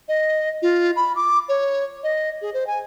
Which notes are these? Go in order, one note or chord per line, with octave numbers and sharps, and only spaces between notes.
D#5
F4
B5
D6
C#5
D#5
G#4
C5
G#5